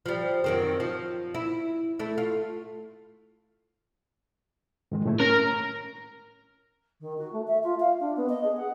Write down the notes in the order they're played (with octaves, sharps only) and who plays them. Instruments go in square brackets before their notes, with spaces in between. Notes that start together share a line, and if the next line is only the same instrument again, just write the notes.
[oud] F3 G3
F#2 D#3 C4
F3
E4
A3 E4
F4
[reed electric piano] G#2 D#3 G#3
A2 A3 E4
[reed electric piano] C#4 [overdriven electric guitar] A#4
[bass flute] D#3
F#4
A3
E5
F4
F5
D4
B3
D#5
G#4
F#5